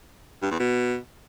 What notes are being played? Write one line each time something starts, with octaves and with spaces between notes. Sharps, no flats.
G2
E2
B2